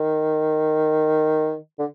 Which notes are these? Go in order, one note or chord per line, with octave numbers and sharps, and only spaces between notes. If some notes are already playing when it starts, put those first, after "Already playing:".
Already playing: D#3
D3